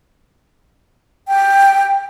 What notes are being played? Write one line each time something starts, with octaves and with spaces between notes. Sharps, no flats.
G5